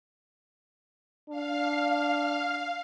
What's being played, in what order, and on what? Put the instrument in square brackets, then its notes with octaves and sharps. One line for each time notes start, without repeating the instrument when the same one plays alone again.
[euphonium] D4 [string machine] F5